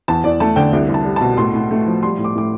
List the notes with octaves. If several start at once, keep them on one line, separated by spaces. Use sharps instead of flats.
E2 A5
E2 D5
A3 A5
D3 G5
C2
C2
A5
G3
B2 A5
A2 C6
A2
A3
F3
G3 C6
A2
D6
A2 D6